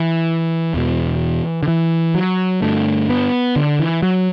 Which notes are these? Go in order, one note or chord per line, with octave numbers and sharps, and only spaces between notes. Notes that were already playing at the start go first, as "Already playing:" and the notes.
Already playing: E3
E2 B2
D3
E3
F#3
G2 D3 A3
B3
D3
E3
F#3